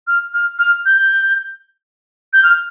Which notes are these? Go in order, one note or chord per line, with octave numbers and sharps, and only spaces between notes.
F6
F6
F6
G6
G6
F6